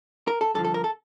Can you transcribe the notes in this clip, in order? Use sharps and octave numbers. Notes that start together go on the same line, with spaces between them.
A#4
A4
G2 D3 F3 A4
A4
A#4
A4